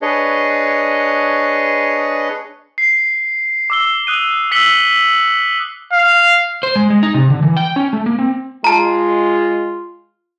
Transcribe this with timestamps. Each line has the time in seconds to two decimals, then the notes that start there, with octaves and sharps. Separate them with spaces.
0.02 D4 G#4 B4 C#5 D#5
2.78 C7
3.70 D6 E6 G7
4.07 D#6 F#6 D#7
4.51 E6 B6 C#7 F#7 G7
5.93 F5
6.63 C5
6.76 G#3
6.90 G#3
7.03 D#4
7.14 C3
7.30 D3
7.43 E3
7.57 G5
7.76 C#4
7.93 A3
8.06 A#3
8.19 C4
8.64 G#3 F4 A5 A#5